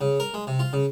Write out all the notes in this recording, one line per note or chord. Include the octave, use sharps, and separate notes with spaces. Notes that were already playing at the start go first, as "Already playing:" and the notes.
C#3
A#4
G#3
C3
F4
C#3